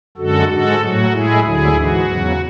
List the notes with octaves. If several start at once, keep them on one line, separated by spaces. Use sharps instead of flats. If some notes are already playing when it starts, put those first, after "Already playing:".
F#2 D3 G#3 F#4 A4
G#2 G#3 F#4 A4
A2 F#3 F#4
A2 G#3 E4 G#4
D2 D3 F#3 E4 G#4
G#2 E3 G#3 F#4
E2 C#3 F#3